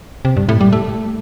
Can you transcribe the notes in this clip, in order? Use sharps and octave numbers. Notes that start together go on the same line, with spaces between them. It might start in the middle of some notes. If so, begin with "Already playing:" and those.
C3
G2
A2
G3
A3